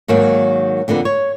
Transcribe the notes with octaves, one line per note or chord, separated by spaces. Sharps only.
G#2 D#3 F#3 A#3
F2 D3 A#3 B3
C#5